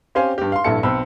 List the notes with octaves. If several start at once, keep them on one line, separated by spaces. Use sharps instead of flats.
C4 C#4 G4 C5 F5 G#5
G2 G4
F5 C6
A#1 G2 E4 A4 A5 C#7
B1 C4 B5 E6